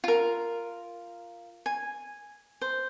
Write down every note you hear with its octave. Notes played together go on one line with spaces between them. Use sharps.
F4 A#4
G#5
C5